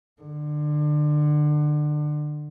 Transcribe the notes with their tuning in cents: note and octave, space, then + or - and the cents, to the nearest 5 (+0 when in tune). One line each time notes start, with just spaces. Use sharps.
D3 +25